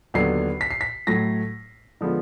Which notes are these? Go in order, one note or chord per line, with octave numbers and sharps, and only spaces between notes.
D#2 D3 F#3 B3 C7
B6
C7
B6
A2 F#3 A3 A#6
D3 F3 G#3 B3